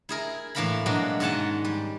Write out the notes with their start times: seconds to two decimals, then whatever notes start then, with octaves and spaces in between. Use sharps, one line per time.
0.09 E4 G#4 A#4
0.55 A2 E3 A#3 A#4 A#5 B5
0.86 B2 F#3 G#3 A#3 D4
1.20 G#2 D#3 C#4 F#5 A5
1.65 G3